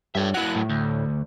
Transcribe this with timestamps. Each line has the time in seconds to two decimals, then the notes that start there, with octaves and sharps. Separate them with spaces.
0.15 G2 C#5 E5
0.34 F#3 E4 F#6
0.55 A2
0.69 D2